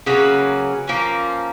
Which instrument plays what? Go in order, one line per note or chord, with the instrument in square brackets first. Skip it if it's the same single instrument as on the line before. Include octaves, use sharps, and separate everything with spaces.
[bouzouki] C#3 F#3 A#3 C#4 B4
F3 A#3 C#4